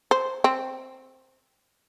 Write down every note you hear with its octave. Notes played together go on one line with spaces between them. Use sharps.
C5
C4